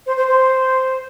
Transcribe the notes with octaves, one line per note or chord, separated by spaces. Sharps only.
C5
C5
C5